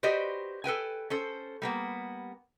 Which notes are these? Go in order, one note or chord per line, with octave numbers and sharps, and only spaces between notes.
F#4 G4 B4 C5 D5 D#5
A4 B4 G5 G#5
C#4 A4 C5
G3 A#3 B3